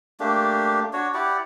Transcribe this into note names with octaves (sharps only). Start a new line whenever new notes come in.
A3 A#3 D4 G4
D4 F#4 C#5
E4 G4 D5 F#5